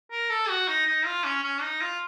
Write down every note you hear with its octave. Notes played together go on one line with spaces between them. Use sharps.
A#4
A4
F#4
D#4
D#4
F4
C#4
C#4
D#4
F4